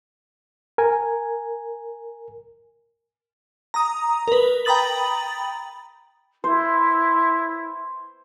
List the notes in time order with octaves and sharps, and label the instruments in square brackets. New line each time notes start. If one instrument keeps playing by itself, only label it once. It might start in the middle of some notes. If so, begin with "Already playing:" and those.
[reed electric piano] A#4 G#5
[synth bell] A#5 D#6
A#4 B4
G5 A#5 B5 D#6 A6 F#7
[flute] E4 [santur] C5